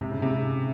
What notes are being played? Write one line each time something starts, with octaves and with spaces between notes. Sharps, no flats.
G#2 C3
C#3
C3
G#2